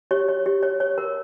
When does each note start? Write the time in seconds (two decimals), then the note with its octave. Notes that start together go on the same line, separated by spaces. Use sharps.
0.11 G4 C#5
0.28 C#5
0.46 G4
0.63 C#5
0.80 C#5
0.98 A#4